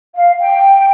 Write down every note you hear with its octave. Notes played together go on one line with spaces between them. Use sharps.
F5
G5